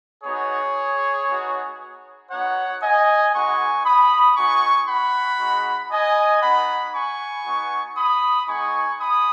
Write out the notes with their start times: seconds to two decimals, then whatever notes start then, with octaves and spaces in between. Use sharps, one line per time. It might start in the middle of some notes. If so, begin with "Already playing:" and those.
0.24 B3 D#4 F#4 G#4 C#5
1.27 B3 D#4 F#4
2.30 B3 D#4 F#4 C#5 F#5
2.81 D#5 G#5
3.33 G#3 B3 D#4 F#4 G#5 C#6
3.84 B5 D#6
4.36 B3 D#4 F#4 G#5 C#6
4.87 F#5 B5
5.39 G#3 D#4 F#4
5.91 D#5 G#5
6.42 B3 D#4 F#4 F#5 B5
6.94 G#5 C#6
7.45 B3 D#4 F#4
7.97 B5 D#6
8.48 G#3 B3 D#4 G#5 C#6
9.00 B5 D#6